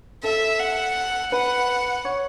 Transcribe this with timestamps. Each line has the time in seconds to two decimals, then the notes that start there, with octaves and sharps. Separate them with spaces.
0.23 A4 E5
0.59 F#5
1.32 B4 F#5
2.05 C#5